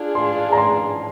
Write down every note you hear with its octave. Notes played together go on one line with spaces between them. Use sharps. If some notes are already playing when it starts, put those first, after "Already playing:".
Already playing: D4 F4 G#4
C6
A#5
C6